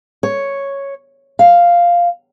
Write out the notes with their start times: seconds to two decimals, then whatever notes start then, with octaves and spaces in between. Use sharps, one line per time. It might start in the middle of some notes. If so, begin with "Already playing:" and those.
0.23 C#5
1.39 F5